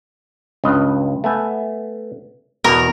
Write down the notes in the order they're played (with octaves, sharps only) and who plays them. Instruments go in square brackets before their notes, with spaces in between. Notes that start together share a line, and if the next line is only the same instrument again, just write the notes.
[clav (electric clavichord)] C#2 G2 D#5
A3 B3 G#5
[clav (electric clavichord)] E2 B2 A#5 [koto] A#4